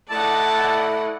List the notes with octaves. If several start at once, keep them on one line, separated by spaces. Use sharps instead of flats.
A3 E4 D5 D#5 F#5 A5